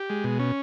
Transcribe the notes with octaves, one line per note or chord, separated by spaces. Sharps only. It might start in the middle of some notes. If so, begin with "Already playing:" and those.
Already playing: G4
G#3
B2
C#4